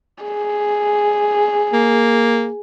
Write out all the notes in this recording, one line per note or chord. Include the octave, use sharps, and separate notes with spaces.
G#4
A#3